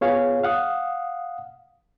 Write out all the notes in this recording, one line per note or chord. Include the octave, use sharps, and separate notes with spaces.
B3 F4 G#4 C#5 F5
F5 F#5 D#6